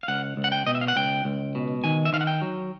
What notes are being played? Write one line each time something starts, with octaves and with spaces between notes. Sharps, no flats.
F5
C#2 F#5
C#2
F#5
G5
B2 D#5
E5
F5
F#5
C#2 G5
C#2
B2
D#3 G#5
E5
D#3 F5
F#5
G5
F#3